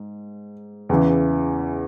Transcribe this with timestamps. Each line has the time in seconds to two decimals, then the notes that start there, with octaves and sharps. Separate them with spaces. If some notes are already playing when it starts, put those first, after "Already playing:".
Already playing: G#2
0.89 E2 C#3 E3